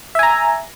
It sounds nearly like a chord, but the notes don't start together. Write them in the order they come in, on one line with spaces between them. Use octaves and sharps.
E5 G#5 A#5